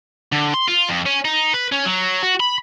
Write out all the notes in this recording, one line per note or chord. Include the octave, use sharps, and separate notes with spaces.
D3
C6
F4
F2
C#4
D#4
B4
C#4
F#3
F#4
B5